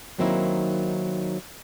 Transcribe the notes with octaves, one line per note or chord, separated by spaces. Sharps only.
D#3 F#3 A#3 C4 D#4 E4